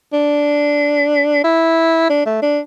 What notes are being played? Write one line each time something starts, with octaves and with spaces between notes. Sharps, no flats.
D4
E4
D4
A3
D4